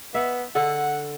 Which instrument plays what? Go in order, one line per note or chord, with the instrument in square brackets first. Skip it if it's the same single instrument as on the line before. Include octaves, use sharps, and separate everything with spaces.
[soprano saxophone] B3 [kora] E5
[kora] D3 A4 [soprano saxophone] F#5